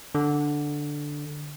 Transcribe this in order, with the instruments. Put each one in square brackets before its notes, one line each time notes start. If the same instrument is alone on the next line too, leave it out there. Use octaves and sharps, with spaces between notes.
[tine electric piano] D3